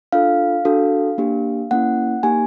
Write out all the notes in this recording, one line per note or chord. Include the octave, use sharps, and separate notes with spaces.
D4 F4 A4 F5
D4 F#4 A4
A#3 D4 G4
A#3 C#4 E4 F#5
A#3 D#4 G4 G#5